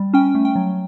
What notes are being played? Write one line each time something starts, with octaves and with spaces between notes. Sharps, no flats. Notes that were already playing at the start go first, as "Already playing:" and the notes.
Already playing: G3
C#4 G5
A3
G5
F#3